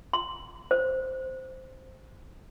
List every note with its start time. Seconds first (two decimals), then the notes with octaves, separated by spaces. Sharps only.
0.13 C6
0.71 C5